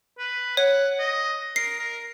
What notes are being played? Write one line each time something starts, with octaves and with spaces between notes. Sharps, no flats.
B4
C#5 F#5
D#5
A#4 C7
A#4